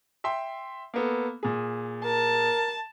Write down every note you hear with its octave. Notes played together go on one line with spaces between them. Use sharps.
E5 G5 C6
A#3 B3 A4
A#2 G#4
A#4 A5